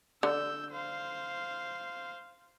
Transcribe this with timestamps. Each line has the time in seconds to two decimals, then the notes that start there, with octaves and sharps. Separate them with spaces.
0.23 D3 E6 G6
0.71 C5 F5